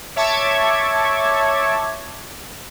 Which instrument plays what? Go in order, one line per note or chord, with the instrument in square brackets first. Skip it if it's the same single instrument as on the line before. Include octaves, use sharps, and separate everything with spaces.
[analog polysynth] C#5 E5 A5 C#6 D6 G#6